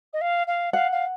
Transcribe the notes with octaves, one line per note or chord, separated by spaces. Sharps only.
D#5
F5
F5
F5 F#5
F5